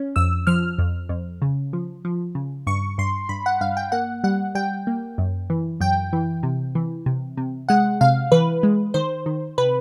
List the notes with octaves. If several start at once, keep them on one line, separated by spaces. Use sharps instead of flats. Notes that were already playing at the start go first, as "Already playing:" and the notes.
Already playing: C#4
F2 E6
F3 F6
F2
F2
C#3
F3
F3
C#3
G2 C#6
G2 C6
G2 B5
F#5
G2 F5
G5
A#3 F#5
G3 F#5
G3 G5
A#3
F#2
E3
F#2 G5
E3
C3
E3
C3
C3
G#3 F#5
C3 F5
E3 B4
G#3
D#3 C5
D#3
C3 B4